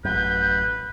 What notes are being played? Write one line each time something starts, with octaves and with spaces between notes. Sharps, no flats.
A1 F#2 B4 G6